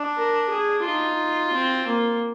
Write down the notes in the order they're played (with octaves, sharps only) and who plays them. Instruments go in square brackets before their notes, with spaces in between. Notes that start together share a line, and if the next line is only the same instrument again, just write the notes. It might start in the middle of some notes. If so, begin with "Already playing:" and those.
Already playing: [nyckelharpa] D4
[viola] A#4
G#4
[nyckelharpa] D#4 [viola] F4
[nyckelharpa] C4
A#3